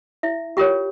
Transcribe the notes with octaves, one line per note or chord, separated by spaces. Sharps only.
E4 E5
F4 G4 A#4 C#5 G5